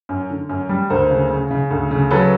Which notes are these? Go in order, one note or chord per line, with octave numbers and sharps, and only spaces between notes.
F#2
D3
F#2
G3
D2 A#4 C5
C#3
C#3
C#3
D2
C#3
F#3 A4 B4